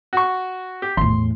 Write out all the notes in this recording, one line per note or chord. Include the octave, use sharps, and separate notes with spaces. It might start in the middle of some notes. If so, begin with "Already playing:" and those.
F#4 C#6
G4
E2 A2 C6